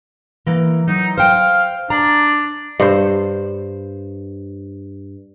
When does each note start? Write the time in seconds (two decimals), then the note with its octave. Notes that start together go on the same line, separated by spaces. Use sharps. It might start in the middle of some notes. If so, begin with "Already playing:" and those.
0.47 E3 A#3
0.88 F#3 D#4
1.18 C5 F5 G5
1.90 D4 A#5
2.80 G2 C5